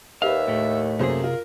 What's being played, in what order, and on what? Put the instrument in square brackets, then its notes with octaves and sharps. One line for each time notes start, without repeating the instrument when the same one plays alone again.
[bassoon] D#2 [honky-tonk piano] G4 B4 [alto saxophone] E5 [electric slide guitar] F5
[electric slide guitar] A2 A3
[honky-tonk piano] F#2 A#3 C5 [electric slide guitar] C3 G#4 [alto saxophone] A3
[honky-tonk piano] F4 [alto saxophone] A#4